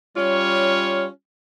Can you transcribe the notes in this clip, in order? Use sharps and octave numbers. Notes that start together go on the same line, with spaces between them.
G3 C#4 F4 C#5